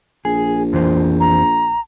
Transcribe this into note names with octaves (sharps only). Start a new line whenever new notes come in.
A#1 G#4
F2 E3 C5
A#5